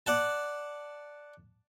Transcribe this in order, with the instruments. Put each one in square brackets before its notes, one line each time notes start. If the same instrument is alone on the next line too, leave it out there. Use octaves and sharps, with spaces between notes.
[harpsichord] D5 F#5 A5